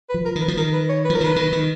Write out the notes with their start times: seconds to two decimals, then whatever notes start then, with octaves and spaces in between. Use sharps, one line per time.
0.09 B4
0.14 F3
0.25 A#4
0.35 D#3
0.41 B4
0.48 F3
0.57 D#3 A#4
0.73 B4
0.89 C#5
1.05 B4
1.10 F3
1.15 A#4
1.21 D#3 B4
1.36 D#3
1.52 D#3